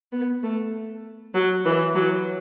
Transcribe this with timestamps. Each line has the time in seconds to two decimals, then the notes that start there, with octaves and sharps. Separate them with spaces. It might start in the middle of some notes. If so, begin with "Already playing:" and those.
0.12 B3
0.43 A3
1.34 F#3
1.65 E3
1.95 F#3